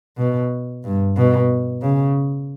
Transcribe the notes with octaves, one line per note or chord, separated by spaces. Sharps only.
B2
G2
B2
C#3